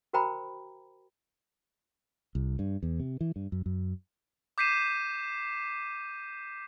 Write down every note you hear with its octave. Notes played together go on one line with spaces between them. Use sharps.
F#4 A#4 C5 G5 A#5 B5
C2
G2
E2
C3
E3
G2
F#2
F#2
D6 G6 B6 C7 D#7 E7